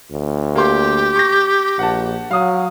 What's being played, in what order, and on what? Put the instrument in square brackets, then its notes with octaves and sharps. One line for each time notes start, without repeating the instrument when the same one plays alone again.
[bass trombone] D2
[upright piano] A#3 C6 [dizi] G4
[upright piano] C#6 A#6
[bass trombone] A#1 [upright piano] F#5 A5
[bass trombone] F#3 [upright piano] F5 D#6